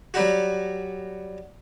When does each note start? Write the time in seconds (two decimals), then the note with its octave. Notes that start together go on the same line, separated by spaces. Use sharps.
0.14 F#3 G3 F#4